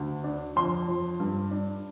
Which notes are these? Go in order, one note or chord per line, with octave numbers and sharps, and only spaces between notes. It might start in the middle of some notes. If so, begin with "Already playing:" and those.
Already playing: D2
D4
F2 C6
F2
G2
D4